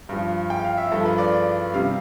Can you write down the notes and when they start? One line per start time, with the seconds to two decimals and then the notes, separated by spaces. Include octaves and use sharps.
0.09 G2 F3
0.50 G5
0.64 F5
0.78 E5
0.92 G2 F3 A4
1.05 B4
1.18 D5
1.32 D5
1.73 C3 G3 F5